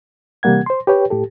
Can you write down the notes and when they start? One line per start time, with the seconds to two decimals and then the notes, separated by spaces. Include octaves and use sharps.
0.43 C3 E3 G3 A#3 F#5 G#6
0.66 C5 C6
0.87 G4 B4 C#5 G5
1.10 A2 G4 A4